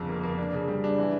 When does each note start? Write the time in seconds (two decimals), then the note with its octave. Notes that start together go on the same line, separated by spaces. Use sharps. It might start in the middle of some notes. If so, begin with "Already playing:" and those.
Already playing: G1 F2 C#3
0.08 A#3
0.23 A#3
0.38 D4
0.53 C#3
0.68 G3
0.84 D4
0.98 E3